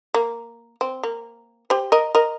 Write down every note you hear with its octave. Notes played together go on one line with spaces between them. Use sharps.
A#3
C4
A#3
G4 C5
A#4 D#5
A#4 D#5